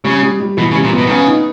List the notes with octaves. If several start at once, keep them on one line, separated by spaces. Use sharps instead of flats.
C#3 G3
G3
G3
B2 E3
C#3
G3
A#2
B2 B3
D#3
C#3 B3
D#4